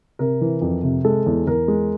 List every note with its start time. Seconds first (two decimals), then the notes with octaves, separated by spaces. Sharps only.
0.19 C3 A#4
0.41 E3
0.62 F2
0.83 C3
1.05 G#3 A4
1.26 E2
1.47 E2 A#4
1.68 G#3